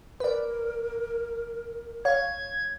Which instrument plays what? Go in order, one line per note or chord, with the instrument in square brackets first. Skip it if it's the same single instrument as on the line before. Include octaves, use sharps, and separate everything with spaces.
[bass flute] A#4 [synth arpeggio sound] B4 D5
[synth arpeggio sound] C#5 F5 [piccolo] G#6